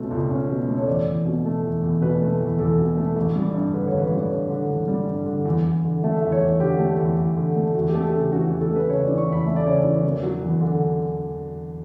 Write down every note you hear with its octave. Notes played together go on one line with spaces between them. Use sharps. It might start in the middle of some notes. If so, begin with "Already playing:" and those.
Already playing: C#2 B2 A3 C#4
C#2
C#4
B2
A3
C#5
E2 D5
E2
B2
A3
E2
E2
B2 B4
A3
E2
E2 A4
B2
A3
A1
G3
G2
D3 B4
A1 C#5
B4
C#5
G3
C#5
G2
D3
A1
G3
G2
D3
E2
E2
D3
A3 E5
E5
E2
C#5
E2
D3 G4
A3
E2
E2
D3
A3
E2 F#4
G4
A3
A4
C#3 G4
E3 F#4
E2
A4
A3
B4
C#3 C#5
E3 D5
C#6
E2 B5
A3 E5
D5
C#3 C#5
D5
E3
E1
F#3
E2
D3